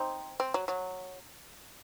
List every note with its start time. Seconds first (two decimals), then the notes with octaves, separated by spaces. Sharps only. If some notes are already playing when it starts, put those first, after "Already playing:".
Already playing: C4 D#4
0.40 C4
0.54 F#3
0.68 F#3